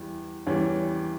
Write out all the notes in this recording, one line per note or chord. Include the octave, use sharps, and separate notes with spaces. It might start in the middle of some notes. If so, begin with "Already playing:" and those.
Already playing: E2 E3 G3
E2 E3 G3 C#4